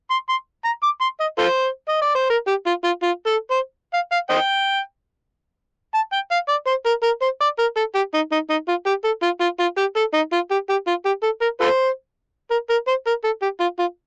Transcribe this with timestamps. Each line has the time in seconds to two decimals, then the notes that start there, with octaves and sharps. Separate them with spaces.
0.11 C6
0.29 C6
0.65 A#5
0.83 D6
1.01 C6
1.20 D#5
1.38 F4 A4 C5
1.89 D#5
2.02 D5
2.15 C5
2.30 A#4
2.48 G4
2.67 F4
2.84 F4
3.03 F4
3.27 A4
3.51 C5
3.94 F5
4.12 F5
4.30 C5 D#5 G5
5.94 A5
6.13 G5
6.31 F5
6.49 D5
6.67 C5
6.86 A#4
7.03 A#4
7.22 C5
7.41 D5
7.59 A#4
7.76 A4
7.95 G4
8.14 D#4
8.32 D#4
8.50 D#4
8.68 F4
8.86 G4
9.04 A4
9.23 F4
9.40 F4
9.60 F4
9.78 G4
9.96 A4
10.14 D#4
10.33 F4
10.51 G4
10.69 G4
10.87 F4
11.05 G4
11.23 A4
11.42 A#4
11.61 F4 A4 C5
12.51 A#4
12.70 A#4
12.87 C5
13.07 A#4
13.24 A4
13.42 G4
13.60 F4
13.79 F4